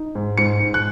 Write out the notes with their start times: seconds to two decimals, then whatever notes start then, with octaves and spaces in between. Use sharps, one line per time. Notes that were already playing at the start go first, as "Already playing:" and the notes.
Already playing: D#4
0.15 G#2
0.38 G#2 C#7
0.60 G#2
0.74 F#6